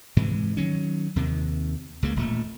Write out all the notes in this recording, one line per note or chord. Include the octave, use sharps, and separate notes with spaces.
G#2 C3 E3 G#3
D#3 F#3 C#4
D#2 C3 D#3
C#2 C#3 A#3
D#1 A#2 A3